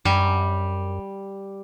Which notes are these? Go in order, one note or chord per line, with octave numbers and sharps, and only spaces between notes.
F#2 G3